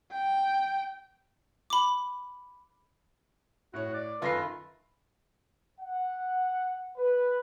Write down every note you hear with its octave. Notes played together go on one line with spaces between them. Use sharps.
G5
B5 D6
A2 F#4 C#5
D5
F#2 D#3 F4 A4 B4 A#6 C7
F#5
B4